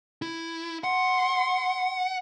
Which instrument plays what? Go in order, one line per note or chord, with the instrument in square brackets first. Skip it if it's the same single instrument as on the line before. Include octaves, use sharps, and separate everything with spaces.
[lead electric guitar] E4
[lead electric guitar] F#5 [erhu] C6